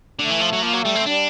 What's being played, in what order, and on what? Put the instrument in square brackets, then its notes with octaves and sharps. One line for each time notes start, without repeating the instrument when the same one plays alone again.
[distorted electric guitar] D3 [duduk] A3
[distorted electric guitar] E3
F3
F#3
[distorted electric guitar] F3 [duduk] A#3
[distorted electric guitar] F#3
[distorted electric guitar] G3 [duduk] A3
[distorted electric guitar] C4
[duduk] G3 [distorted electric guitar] D4